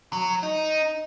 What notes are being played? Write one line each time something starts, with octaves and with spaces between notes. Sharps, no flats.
F#3
D#4